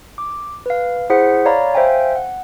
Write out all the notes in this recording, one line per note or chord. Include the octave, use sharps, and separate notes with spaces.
D6
B4 F5
E4 G#4 C5 F#5 B6 C#7
C#5 D5 F5 A#5 B5
C5 E5 F5 G5 G#5
F#5